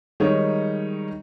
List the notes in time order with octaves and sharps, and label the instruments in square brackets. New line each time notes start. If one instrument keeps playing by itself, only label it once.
[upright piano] D#3 G3 G#3 D#4 C#5